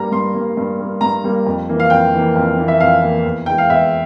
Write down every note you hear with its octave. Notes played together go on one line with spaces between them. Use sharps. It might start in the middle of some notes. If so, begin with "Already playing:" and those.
Already playing: G2 G3 A#3 A#5
G2 C6
G3 A#3
G2
G3 A#3
G2 A#5
G3 A#3
F2
E3 A#3
F5
F2 G5
E3 A#3
F2
E3 A#3
E5
F2 F5
E3 A#3
E2
E3 G#3 G5
F5
E2 E5